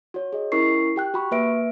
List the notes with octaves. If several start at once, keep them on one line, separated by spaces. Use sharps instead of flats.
F#4 C#5
G#4 D#5
C#4 E4 A#4 C#6 C7
G4 G5 F#6
F#4 B5 C#6
A#3 B4 E5 D7